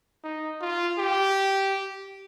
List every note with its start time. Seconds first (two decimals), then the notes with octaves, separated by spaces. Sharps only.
0.24 D#4
0.61 F4
0.98 G4